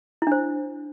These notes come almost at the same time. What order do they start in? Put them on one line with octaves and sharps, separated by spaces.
E4 D4 C5